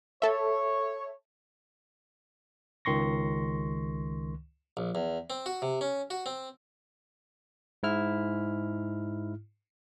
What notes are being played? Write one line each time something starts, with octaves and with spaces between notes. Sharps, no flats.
A4 C#5 E5
C#2 D#3 C6 C#6 A#6
A#1
E2
C4
F#4
C3
C#4
F#4
C4
G#2 E4 F6